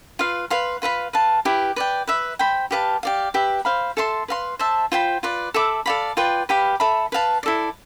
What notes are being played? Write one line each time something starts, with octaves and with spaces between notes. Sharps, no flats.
F4 B4 F5
B4 F5 C6
F4 B4 F5 B5
B4 F5 A5
E4 G4 B4
B4 D5 G5
B4 E5 B5
C5 G5 B5
G4 B4 F5 A5
G4 D5 F5
G4 B4 E5
C5 F5 B5
A4 E5 A5 C6
B4 F5 C6
C5 E5 A5
F4 C5 G5 B5
F4 B4 D5
A4 E5 B5 D6
A4 D5 F5 B5
F4 B4 D5 G5
G4 B4 F5 B5
A4 E5 B5
B4 F5 A5
E4 A4 D5